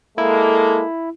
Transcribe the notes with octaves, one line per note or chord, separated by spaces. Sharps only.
G#3 A#3 E4 A4